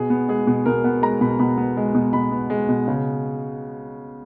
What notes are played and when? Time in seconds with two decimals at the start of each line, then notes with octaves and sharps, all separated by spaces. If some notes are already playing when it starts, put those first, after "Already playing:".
Already playing: B2 G#4
0.10 B3
0.28 G#3 G#4
0.47 B2
0.66 B2 A#4
0.84 B3 F#5
1.02 G#3 A#5
1.21 B2 B5
1.39 B2 B5
1.57 B3
1.77 G#3
1.94 B2
2.13 B2 B5
2.31 B3
2.50 G#3
2.69 B2
2.88 C#3